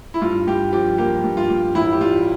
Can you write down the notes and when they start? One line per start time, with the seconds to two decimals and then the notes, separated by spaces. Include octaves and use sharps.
0.14 E4
0.21 G2 F4
0.47 G2 G4
0.73 F3 G4
0.98 A#3 G4
1.24 G2
1.37 F4
1.49 G2
1.75 A1 E4
1.93 G4
2.01 G3 F4